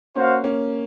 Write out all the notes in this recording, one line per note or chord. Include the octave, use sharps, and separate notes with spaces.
A#3 C#4 F#4 C5 F5
A#3 C#4